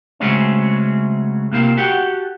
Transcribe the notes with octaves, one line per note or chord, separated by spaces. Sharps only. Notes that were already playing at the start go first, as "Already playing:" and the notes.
C#3 F#3 G#3 A3 C4 C#4
C3 A#3 C4 F4
F#4 G4 A4 F#5 G5